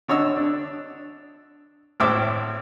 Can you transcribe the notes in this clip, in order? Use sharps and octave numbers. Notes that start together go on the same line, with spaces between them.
D3 C#5 D#5 E6
D4
G#1 A2 C5 E5 D6 E6